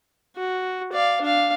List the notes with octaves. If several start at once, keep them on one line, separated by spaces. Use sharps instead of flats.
F#4
D5 F5
D4 F5